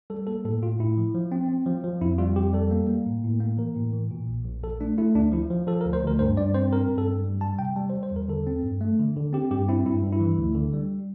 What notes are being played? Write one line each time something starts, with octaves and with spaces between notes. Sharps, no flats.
G3 A4
A#3 A4
A2 A4
A2 F4
A2 E4
F3
F3
C4
C4
F3
F3
F2 E4
G3 F4
F2 G4
G3 A4
A#3
A#3
A2
A2
A#3
E3 A#4
A2
E3
A#2
A#1
A#1
A#1 A4
A3 D4
A3 E4
D2 D4
F3 E4
F3
F3 A4
A#4
D2
C5
D2 A#4
G2 C5
G2 D5
C4 C5
C4 A#4
G2
A4
G2
G3
G3 A5
C3 G5
G3 A5
C5
G3
C5
E2
A#4
D3 A4
C4
G2
A3
D3
D3
C4 G4
G2 G4
C4 E4
G2 E4
G2
E4
E3
D2
D3
G3